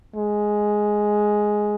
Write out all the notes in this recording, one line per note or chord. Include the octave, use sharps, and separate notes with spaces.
G#3